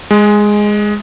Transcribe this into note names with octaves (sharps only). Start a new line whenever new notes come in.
G#3